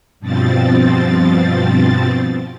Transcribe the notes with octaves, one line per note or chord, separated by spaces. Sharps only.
G2 B2 F3 C4 A6